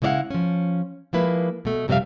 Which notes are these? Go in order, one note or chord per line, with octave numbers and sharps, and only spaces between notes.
C#3 G#3 E4 D5 F5 F#5
F3 C#4
F3 G#3 A#3 E4 B4
B2 A3
F2 C3 G3 C4 E5 F5